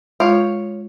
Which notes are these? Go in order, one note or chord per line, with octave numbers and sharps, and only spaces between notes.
G#3 F4 C#5 F5 C6